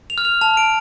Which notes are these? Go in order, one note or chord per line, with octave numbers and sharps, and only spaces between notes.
F7
F6
F7
A5 F7
D7